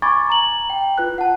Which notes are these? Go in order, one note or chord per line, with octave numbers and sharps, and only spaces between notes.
G#5 B5 C#6 D6 G#6 A6
A#5 F#7
G5
F4 B4 F#6
F#5 A5